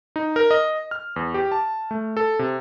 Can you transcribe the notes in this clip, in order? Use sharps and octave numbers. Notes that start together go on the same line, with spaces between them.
D#4
A#4
D#5
F6
E2
G4
A5
A3
A4
C3